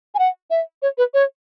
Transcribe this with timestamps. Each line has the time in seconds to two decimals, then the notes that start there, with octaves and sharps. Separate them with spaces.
0.15 G#5
0.19 F#5
0.50 E5
0.82 C#5
0.98 B4
1.14 C#5